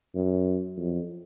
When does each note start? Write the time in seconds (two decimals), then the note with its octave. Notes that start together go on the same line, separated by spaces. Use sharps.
0.15 F#2
0.77 F2